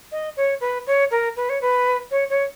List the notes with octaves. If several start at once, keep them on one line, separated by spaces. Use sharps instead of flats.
D#5
C#5
B4
C#5
A#4
B4
C#5
B4
C#5
C#5